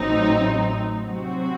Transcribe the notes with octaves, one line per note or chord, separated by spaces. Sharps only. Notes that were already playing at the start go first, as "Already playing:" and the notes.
Already playing: A1 A2 F#3 C4 D#4
C3 F#3 C4 F#4